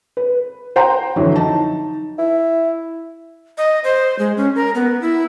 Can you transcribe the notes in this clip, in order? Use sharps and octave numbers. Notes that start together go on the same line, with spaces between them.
B4
C5 F#5 G5 A#5 C6
F2 D3 E3 F#3
D#4 A5
E4
D#5
C5
G#3
C#4
A#4
B3
E4